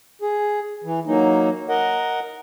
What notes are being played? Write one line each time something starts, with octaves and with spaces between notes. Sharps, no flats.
G#4
E3
F#3 A#3 D#4
A#4 D#5 F#5